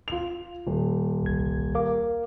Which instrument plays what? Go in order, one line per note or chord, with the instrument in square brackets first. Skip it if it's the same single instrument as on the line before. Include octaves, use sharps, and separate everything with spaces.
[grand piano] F4 F7
D#1
[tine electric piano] G1 C2 G#6
A#4 F5 D6